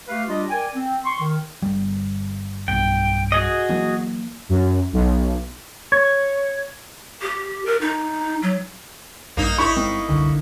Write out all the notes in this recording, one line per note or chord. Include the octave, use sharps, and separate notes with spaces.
A3 G4 B4 F5
G3 D4 F4 G4 D#5
A#4 D5 G5 G#5
C4
C6 C#6
D#3
G1 G3
B1 G2 G5
F#4 G#4 D#5
E3 F#3 A#3
F#2
B1
C#5
G4
A#4
D#4
F#3
A#1 G2 A#3 D#4
G#1 D#4 E4 C#6
G1 G#3 C4 A#4 D#5 F5
F#1 C2 D3